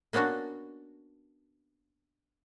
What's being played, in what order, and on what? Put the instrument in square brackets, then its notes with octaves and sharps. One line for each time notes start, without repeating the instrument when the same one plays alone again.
[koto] A#3 B3 C#4 D4 F#4